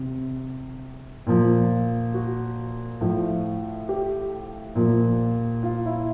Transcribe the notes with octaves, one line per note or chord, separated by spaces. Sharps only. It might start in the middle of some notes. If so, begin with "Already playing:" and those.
Already playing: C3
A#2 F3
F#4
A2 F3
G4
A#2 F3
F4
E4